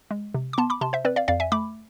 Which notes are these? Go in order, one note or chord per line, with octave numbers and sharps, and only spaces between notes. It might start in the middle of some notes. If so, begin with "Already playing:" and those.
G#3
C3
D6
B3 A5 C6
B5 D6
C3 A5 C6
C5 E5
C4 B4 D5
D5 F5
F2 D5 F5
E5 G#5
A3 B5 D6